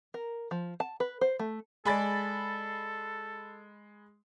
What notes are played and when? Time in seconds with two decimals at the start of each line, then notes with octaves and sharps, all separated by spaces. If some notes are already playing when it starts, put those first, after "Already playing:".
0.14 A#4
0.51 F3
0.80 A5
1.00 B4
1.21 C5
1.39 A3
1.85 G#3 G#4 A4 D5 B5 A6